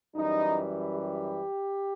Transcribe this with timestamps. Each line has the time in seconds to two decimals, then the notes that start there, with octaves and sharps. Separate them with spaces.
0.16 F#2 E3 G3 D#4
0.95 G4